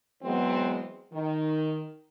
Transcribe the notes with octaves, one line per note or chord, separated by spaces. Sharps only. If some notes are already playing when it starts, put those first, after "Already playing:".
E3 F#3 G#3 B3 C4 C5
D#3